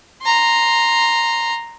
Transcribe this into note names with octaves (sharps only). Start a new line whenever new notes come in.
A#5 C6